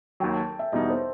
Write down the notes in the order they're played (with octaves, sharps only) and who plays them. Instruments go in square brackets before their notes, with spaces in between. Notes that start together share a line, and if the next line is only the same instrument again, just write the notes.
[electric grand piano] D#2 D#3 F#3 [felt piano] G5
[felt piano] A5
E5
[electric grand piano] E2 B2 G3 B3 D#4 [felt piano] D#5
[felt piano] C5